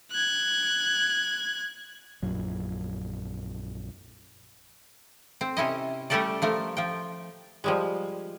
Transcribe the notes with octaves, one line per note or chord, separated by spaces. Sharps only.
F#6 G#6
A#1 F#2 F#3
C4
C3 C#4 E4 D#5
G3 A3 C#4 G4 A4 D5
F3 A3 A#4
F3 G5
F3 G3 G#3